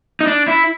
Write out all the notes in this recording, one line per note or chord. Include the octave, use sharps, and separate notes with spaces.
D#4
D4
E4